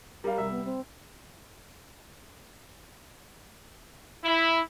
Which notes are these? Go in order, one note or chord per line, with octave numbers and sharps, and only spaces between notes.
G3 A#4 F5 A#5
C2 G3 E5 E6
B3
C4
E4